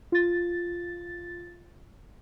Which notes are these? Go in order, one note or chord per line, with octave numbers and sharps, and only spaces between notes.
F4 A6